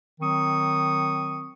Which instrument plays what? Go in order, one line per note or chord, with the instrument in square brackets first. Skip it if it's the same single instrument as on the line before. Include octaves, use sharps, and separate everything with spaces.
[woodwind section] D#3 F#3 C4 C#6 D#6